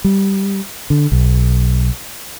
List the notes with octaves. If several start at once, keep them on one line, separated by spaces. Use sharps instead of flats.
G3
D3
B1